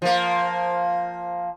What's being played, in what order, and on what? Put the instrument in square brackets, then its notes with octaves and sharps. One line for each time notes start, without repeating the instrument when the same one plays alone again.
[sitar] F3 A#3